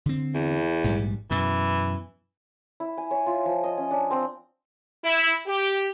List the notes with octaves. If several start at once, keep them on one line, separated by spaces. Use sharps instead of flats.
D3 C4
E2
A#1 G#2 G3
F#2 B2 E3
E4
G#5
C#5
F4
F3
D#5
C#4
D4
C4
E4
G4